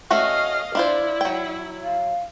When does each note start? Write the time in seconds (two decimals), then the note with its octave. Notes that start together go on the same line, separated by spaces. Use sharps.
0.10 A3 C#4 F#4 D#5 F5
0.75 D4 E4 F4 C5 D5
1.21 F#3 G5
1.83 F5